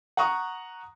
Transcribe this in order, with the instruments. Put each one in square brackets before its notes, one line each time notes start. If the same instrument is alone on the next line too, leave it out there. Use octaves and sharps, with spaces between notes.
[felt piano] F#5 A#5 C#6 D#6